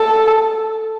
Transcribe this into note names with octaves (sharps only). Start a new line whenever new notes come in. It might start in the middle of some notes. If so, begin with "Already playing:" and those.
Already playing: A4